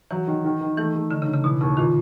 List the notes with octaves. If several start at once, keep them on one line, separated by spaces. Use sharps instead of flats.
E3 F#3
D#3
D#3
D#3
E3 A3
A3
D3 D#4
C#3
D3
C#3
B2 E3
D#2 C#3
A#2 D#3